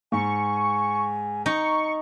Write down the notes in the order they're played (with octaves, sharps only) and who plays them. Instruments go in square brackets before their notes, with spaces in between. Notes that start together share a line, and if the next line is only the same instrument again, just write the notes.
[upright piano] G#2 [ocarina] G#5 [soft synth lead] C#6
[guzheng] D#4 [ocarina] A#5 [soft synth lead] C#6